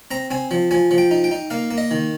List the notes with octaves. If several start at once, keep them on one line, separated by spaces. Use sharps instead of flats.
C4 A#5
C4 G#5
F3
F3 G#5
F3
G5
D#4
G5
D#4
A#3 F5
A#3
D#5
D#3